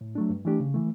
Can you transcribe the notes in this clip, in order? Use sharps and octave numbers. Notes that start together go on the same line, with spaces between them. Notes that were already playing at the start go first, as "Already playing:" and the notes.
A2
F#3 A3 D4
G2
E3 A3 D4 G4
C#3
E3 A3